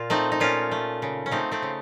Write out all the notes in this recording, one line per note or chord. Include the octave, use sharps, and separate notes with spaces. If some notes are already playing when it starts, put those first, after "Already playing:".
Already playing: A#2 F4
A3 C4 D#4
D#4
A#2 C#4 F4
A3
C#3
C#4
A3 C4 D#4
A3 C4
C#3